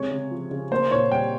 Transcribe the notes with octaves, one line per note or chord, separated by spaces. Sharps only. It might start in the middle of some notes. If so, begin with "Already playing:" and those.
Already playing: C3 G#3 C#5
C#3
F3
C#3
A#3 C5
A#2 C#5
G3 G5